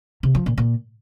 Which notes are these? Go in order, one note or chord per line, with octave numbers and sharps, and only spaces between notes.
C3
F3
A#2
A#2